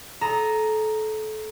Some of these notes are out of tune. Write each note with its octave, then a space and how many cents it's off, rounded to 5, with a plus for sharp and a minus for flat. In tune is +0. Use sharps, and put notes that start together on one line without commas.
A4 -25 A#5 +0 D#6 +0